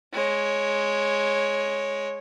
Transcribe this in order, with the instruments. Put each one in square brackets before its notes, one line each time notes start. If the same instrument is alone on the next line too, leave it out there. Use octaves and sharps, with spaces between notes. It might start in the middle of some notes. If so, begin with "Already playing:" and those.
[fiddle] G#3 C#5